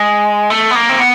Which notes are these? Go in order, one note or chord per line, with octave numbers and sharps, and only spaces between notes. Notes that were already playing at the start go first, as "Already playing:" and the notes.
Already playing: G#3
A3
B3
A#3
C4
B3